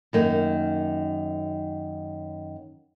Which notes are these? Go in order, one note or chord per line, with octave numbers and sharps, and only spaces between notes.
F#2 D#3 A#3